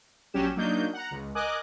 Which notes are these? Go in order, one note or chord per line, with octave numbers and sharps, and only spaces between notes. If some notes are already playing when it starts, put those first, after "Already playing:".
A#1 F#3 C#4 G4 E7
F#3 A#3 D4 D#4 G6
F#5 A#5
C#2
A#4 D#5 G#5 D6 D#6 F#6